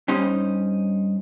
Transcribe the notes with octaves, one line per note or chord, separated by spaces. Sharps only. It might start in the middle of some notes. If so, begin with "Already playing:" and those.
G2 C#4 D#4 C5